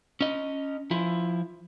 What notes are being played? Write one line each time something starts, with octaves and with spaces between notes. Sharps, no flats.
C#4 D#5
F3 E4